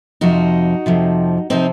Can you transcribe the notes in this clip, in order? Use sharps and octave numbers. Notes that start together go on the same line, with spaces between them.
F2 C3 F3 D#4 F#4
F2 C3 F3
C3 F3 C4 D#4